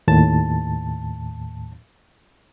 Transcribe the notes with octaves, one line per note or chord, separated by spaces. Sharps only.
D#2 A2 A5